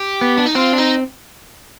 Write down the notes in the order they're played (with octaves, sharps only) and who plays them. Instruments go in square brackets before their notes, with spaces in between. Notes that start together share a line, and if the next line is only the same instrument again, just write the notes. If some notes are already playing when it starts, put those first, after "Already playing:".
Already playing: [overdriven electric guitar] G4
[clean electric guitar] B3
[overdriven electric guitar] D4
D#4
[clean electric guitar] C4 [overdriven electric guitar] F4
[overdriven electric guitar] D4
D#4